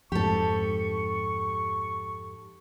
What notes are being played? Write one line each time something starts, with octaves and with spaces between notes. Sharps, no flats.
F2 G#2 G4 A4 C#6